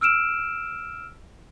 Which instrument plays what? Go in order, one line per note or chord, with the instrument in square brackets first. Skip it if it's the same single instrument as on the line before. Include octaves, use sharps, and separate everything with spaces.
[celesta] E6 F6 D7 E7